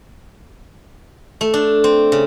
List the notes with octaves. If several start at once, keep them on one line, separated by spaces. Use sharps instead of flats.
A3
D4
C4
C#3